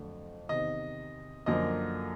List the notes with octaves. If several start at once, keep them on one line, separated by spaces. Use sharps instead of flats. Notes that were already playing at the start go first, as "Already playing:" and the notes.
Already playing: F2 D3 F#3 A3
E2 C3 D#3 D#5
F#2 D3 F3 A#3 D#5